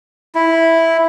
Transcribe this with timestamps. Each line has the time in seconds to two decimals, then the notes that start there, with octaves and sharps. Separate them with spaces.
0.35 E4